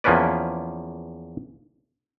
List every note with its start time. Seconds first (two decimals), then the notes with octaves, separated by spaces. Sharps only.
0.04 E2 F3 A#3 C#4 B4 D5